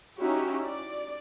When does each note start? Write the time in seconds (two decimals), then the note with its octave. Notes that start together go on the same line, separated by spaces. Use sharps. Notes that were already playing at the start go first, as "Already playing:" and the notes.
0.18 C#4 D#4 E4 F#4 G4
0.64 D5